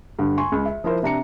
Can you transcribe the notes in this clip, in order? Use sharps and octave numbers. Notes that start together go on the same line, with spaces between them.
G2 D3
G#5 C6 C#6
C#2
E5
F3 E4 A#4 C5
C3 D4 A#5 C#7